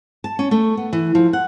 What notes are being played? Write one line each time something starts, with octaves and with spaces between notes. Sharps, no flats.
A5
C#4
A3
B3
E3
F3
F#5